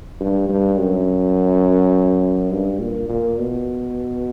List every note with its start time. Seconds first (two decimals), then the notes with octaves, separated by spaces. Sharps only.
0.20 G2
0.49 G2
0.78 F#2
2.52 G2
2.80 A#2
3.09 A#2
3.38 B2